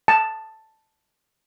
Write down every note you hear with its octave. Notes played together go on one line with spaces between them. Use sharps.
A5